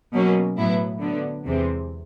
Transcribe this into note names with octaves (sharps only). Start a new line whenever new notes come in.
B2 F#3 A#3 C#4
A2 F#3 B3 E4
D3 F#3 B3
E2 C3 E3 G#3 C4